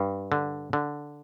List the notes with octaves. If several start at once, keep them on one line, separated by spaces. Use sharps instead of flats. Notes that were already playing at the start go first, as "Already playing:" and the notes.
Already playing: G2
D3
D3